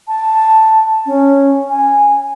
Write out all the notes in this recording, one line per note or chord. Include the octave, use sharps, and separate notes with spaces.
A5
C#4
G#5